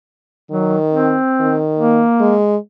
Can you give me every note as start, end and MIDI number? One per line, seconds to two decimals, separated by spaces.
0.51 1.16 51
0.51 0.77 54
0.92 1.59 60
1.41 2.02 51
1.77 2.38 58
2.20 2.57 56